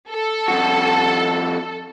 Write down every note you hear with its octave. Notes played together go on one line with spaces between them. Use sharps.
A4
F2 F#4